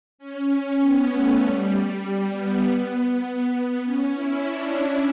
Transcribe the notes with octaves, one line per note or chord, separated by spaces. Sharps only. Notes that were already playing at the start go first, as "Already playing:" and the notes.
C#4
B3
A3
G3
G3
B3
C#4
E4
D4
D4